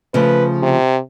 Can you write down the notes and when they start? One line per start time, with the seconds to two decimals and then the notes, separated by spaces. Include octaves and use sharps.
0.14 C#3 F3 A3 B4
0.62 C3